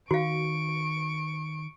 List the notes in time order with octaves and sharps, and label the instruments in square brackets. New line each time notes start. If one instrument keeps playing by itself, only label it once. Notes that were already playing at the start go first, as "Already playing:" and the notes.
[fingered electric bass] D#3 [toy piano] F#4 F5 [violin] C#6 D7